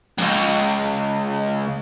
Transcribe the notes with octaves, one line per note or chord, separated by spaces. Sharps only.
C#2 G2